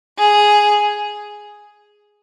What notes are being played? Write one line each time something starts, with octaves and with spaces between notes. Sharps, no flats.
G#4